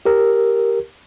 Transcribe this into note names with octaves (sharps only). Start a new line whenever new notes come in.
G4 A#4